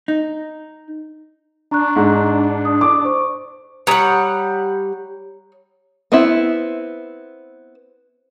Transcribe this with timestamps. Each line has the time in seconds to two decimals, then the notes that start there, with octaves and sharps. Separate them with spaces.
0.08 D#4
1.71 D4 A#5 C#6 F#6
1.96 G#2
2.65 D#6
2.81 D6
3.05 C5 C#6
3.87 G3 C#5 F#5 A#5 D#6
6.12 B3 C4 E4